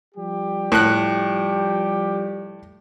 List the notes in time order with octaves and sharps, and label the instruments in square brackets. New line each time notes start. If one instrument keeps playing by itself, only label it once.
[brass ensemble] F3 G3 G4
[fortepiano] A2 F#6